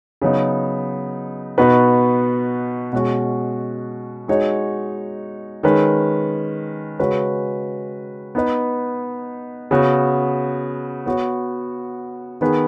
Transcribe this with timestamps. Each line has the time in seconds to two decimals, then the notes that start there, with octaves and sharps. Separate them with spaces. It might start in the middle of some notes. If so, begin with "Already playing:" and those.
0.22 C#3 F#3 B3 D#4
1.58 B2 B3 D#4 F#4 B4
2.93 B2 G#3 C#4 F#4
4.28 G#3 D#4 F#4 C#5
5.63 D#3 G#3 C#4 B4
6.99 C#3 G#3 C#4 F#4 B4
8.35 B3 D#4 B4
9.71 C#3 B3 F#4
11.06 B3 F#4 C#5
12.41 D#3 B3 G#4 B4